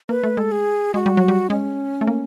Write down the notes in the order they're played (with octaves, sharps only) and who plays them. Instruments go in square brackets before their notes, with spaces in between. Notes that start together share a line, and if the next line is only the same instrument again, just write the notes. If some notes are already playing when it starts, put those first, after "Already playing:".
[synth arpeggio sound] A#3 [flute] B4
[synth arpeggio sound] A3
[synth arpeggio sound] G#3 [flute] A4
[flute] G#4
[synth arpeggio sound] G#3 [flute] F#4
[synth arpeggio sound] G3
F#3
G3
[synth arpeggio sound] G#3 [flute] C#4
[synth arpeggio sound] A3
A#3